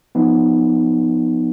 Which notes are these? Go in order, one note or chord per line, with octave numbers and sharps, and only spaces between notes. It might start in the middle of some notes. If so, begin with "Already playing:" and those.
F3 B3 D#4